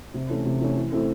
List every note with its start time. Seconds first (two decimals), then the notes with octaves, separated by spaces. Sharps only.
0.14 C3
0.30 E3 A3 C#4
0.45 C3
0.61 E3 A3 C#4
0.76 E3
0.92 A3 C4 E4 A4